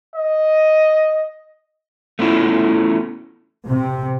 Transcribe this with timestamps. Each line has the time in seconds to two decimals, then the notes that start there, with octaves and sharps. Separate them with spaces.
0.16 D#5
2.19 A3 B3 C#4 E4 F4
3.67 C3